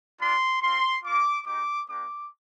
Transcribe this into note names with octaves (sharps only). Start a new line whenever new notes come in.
G3 D4 F4 C6
C4 F4 C6
A#3 F4 D6
G#3 D#4 G4 D6
A#3 D4 G4 D6